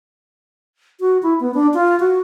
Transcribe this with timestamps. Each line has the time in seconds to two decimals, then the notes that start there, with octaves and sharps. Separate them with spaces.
1.00 F#4
1.23 E4
1.40 B3
1.54 D4
1.74 F4
2.00 F#4